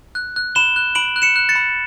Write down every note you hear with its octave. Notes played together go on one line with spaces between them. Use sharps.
F#6
F#6
B5 E7 G7
F#6
B5 D7 F#7
F#6
C#7 E7
F#6
A6 C#7
B5